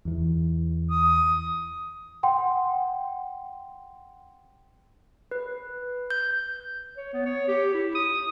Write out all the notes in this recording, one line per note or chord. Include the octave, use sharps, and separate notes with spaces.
E2 E3
D#6
F#5 G5 C6
B4
G6
C#5
B3
C#5
G4
E4
D#6